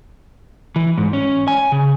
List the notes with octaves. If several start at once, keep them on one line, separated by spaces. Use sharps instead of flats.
E3
G#2
C#4
G#5
C#3